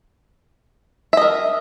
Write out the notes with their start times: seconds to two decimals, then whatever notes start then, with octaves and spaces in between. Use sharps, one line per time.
1.13 E5
1.17 D#5
1.22 A#4